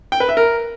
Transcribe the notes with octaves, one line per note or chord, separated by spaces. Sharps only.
G5
B4
E5
A#4